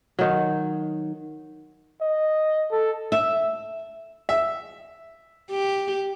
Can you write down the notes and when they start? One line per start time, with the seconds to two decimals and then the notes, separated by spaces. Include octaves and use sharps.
0.19 D#3 F#3
2.01 D#5
2.72 A4
3.12 E5
4.29 E5
5.51 G4